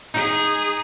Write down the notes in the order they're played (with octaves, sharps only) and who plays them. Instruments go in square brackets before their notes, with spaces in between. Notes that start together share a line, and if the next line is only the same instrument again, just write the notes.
[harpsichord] D#4 [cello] G#4